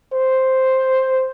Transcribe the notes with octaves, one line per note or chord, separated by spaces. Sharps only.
C5